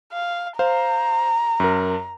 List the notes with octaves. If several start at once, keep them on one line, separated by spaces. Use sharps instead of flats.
F5
C5 F5 A#5
F#2 A#4